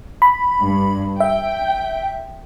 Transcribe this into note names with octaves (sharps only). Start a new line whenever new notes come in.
B5
G2
E5 G5